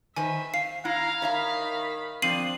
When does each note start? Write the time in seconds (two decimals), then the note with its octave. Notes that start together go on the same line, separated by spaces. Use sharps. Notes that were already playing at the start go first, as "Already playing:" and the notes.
0.16 D#3 B4 C5 E5 G#5
0.54 F5 C7
0.85 E4 F5 A#5
1.22 D#3 C#5 E5 A#5 B5
2.22 F3 C4 D4 C7 D#7 F#7